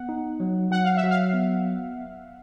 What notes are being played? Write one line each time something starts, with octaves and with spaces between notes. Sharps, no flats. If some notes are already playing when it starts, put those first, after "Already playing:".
Already playing: B3 F#5
D#4
F#3
F#3 F#5
F5
E5
F#3
F5
B3